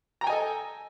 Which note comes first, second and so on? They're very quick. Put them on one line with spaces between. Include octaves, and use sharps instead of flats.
A#5 G5 G#5 D#5 A4